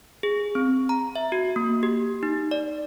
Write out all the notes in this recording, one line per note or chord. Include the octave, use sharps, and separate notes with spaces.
G#4
C4
A#5
E5
F#4
A#3
G4
D#4
D5